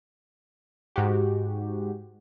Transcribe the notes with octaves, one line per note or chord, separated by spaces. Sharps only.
G#2 F#4 G4